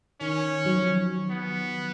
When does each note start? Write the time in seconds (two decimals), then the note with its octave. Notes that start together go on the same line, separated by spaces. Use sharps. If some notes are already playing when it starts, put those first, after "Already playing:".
0.21 D#3 C#4
0.66 F#3
0.76 F3
1.30 B3